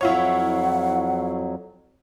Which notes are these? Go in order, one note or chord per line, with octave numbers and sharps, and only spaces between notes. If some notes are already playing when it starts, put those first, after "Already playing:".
F2 F#3 E4 F4 C#5 F#5